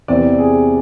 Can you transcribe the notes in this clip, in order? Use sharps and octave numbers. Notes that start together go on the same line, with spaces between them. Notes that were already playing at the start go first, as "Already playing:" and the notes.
E2 C3 E3 D5
G#4